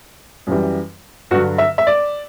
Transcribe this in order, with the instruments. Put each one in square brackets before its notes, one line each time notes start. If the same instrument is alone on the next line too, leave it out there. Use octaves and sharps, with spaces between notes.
[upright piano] F#2 E3 G3
G2 D3 F#3 F#4
E5
E5
D5